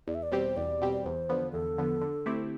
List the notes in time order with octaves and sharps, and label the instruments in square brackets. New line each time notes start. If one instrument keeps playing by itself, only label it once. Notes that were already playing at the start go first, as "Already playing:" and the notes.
[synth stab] E2 [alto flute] D5
[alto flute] E5
D5
[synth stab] B2 G3 C4 G4 [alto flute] C5
[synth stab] E2 [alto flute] D5
[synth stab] B2 G3 C4 G4
[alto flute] D5
[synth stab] E2 [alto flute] C5
[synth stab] D3 F3 B3
[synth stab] E2 [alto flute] A4
[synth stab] D3 F3 B3
D3
A3 C4 E4 G4